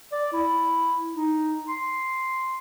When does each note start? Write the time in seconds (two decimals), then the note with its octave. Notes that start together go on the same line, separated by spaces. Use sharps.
0.12 D5
0.33 E4
1.15 D#4
1.68 C6